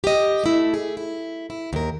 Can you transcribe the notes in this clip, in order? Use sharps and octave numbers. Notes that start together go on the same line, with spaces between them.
G4 D#5
A3 E4
G#4
E4
E4
D#2 A#4